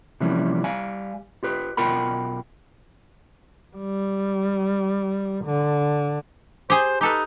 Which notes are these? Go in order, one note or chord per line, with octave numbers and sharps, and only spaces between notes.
C3 E3 F3 G3 A#3 C#4
G3 F5 G#5
F4 G4 B4
B1 B2 F4 A#4 G5 B5
G3
D3
G4 G#4 C5
D#4 G4 A4 B4